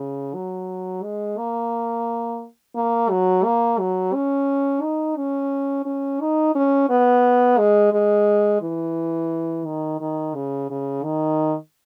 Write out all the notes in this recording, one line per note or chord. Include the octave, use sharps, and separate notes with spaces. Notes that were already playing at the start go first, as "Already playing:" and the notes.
Already playing: C#3
F#3
G#3
A#3
A#3
F#3
A#3
F#3
C#4
D#4
C#4
C#4
D#4
C#4
B3
G#3
G#3
E3
D#3
D#3
C#3
C#3
D#3